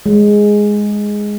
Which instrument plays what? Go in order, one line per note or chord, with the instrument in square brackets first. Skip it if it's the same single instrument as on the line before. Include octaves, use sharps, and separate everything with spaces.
[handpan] G#3